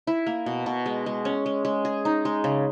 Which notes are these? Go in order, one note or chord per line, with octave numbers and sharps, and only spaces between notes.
E4
A#3
B2
B2
G#3
G#3
C#4
G#3
G#3
G#4
D#4
G#3
C#3